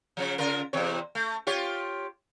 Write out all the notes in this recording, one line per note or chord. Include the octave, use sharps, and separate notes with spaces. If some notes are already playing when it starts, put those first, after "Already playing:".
C#3 F3
C#3 F4 A#4
E2 C3 C#5
A3
F4 G4 C#5